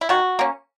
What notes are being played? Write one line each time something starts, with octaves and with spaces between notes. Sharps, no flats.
E4
D#3 F#4
A#3 C#4